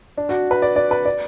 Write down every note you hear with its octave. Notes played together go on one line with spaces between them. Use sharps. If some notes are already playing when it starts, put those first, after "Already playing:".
D4
F#4
B4
D5
D5
B4
D5